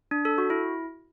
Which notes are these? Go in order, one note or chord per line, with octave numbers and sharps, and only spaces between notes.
D4
A4
F#4
E4